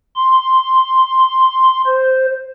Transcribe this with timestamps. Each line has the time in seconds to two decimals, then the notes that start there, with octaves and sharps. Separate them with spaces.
0.16 C6
1.86 C5